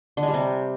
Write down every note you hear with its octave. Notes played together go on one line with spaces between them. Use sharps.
D3
G#3
G3
C3